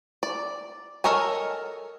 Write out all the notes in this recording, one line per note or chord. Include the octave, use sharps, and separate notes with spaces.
D5
A4 A#4 C#5 D#5 G#5